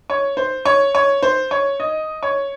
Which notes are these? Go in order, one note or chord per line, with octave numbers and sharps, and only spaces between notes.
C#5
C5
C#5
C#5
C5
C#5
D#5
C#5